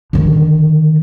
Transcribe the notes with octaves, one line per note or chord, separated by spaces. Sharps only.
D3 D#3